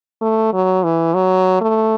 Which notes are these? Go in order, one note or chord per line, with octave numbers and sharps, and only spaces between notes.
A3
F#3
E3
F#3
A3